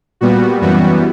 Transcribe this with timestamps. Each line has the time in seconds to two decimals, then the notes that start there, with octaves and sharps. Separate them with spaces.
0.21 A#2 G3 B3 F#4
0.61 F#2 E3 G3 B3 F#4